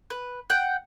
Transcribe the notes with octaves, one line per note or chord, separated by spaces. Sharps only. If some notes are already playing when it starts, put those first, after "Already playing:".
B4
F#5 G5